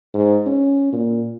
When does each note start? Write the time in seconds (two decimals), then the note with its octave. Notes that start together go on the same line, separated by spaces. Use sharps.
0.14 G#2
0.46 C#4
0.93 A#2